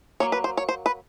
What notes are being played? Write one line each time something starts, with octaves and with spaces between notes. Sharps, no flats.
F#3 A#3 C#5
B4
C5
C#5
C5
B4